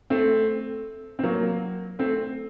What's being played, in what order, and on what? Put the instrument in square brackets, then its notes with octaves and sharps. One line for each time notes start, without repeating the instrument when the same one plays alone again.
[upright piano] A3 C4
C4
F#3 A#3
A3 C4